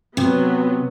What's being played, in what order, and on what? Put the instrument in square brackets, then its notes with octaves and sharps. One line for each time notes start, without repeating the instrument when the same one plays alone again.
[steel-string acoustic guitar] C3 [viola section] F#3 B3